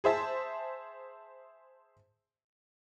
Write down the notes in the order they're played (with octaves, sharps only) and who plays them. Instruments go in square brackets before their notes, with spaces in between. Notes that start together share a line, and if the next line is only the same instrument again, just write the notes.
[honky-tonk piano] G#4 C5 E5 A5